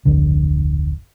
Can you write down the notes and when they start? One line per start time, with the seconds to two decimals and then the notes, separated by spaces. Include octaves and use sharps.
0.05 D1 G#1 F2 D3